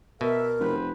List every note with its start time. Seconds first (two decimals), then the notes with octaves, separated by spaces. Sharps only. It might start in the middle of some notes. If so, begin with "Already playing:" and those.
0.21 B2 A#4 E5
0.60 F1 B4 C5